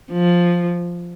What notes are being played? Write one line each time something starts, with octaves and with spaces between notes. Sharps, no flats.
F3